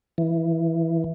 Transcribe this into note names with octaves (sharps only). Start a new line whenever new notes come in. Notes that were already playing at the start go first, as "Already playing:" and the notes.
E3